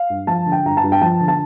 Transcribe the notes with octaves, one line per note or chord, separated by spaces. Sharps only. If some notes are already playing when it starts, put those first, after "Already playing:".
Already playing: F5
G2
F3 A5
D3
G5
G2 A#5
A5
G2
G5
F3 A5
D3
A5